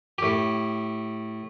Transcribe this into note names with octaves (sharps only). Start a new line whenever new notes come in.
A2 G4